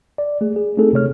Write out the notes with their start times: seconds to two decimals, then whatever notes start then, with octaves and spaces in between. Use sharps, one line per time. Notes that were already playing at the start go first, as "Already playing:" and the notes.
0.18 D5
0.41 A3 G#4
0.56 G#4
0.77 A3 C4 D#4 G#4 A4
0.93 C3 A3 C#5 F6